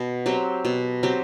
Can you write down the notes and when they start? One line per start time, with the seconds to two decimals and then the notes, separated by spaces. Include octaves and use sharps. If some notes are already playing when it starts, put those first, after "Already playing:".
Already playing: B2
0.26 F#3 C4 G4
0.65 B2
1.03 F#3 C4 G4